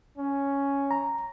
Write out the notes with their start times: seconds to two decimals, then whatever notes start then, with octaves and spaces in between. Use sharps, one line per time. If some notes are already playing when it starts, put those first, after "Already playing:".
0.18 C#4
0.91 A#5